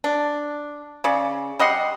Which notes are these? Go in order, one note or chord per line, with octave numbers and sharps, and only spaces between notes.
D4
C#3 D5
G3 D#5 F#5 C6